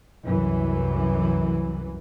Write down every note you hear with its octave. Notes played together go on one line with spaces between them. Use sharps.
C2 F#2 E3